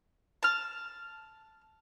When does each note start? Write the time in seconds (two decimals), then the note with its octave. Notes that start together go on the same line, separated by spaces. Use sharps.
0.43 A5 F6